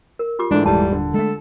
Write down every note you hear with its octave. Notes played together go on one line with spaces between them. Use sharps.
A#4
F4 G4 D6
G#2 E3 G#3 A3 D4
D#1 G3 A5
D3
G#3 A3 A4